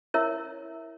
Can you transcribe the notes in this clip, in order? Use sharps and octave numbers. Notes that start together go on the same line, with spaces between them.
E4 A#4 C#5 E5